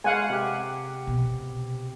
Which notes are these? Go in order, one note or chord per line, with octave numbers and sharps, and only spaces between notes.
G#3 F5 F#5 G#5
C3 G4
B2